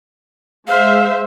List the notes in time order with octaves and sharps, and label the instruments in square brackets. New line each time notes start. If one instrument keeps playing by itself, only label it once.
[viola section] G#3 C5 E5 [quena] F5